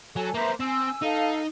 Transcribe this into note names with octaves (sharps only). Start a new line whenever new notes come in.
F#3 A4 G#5
A#3 B4 C5 E5 A#5
C4 G#5 E6
D#4 A4 F5